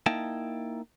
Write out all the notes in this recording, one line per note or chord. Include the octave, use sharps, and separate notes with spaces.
A#3 D#4 E4 G5 A5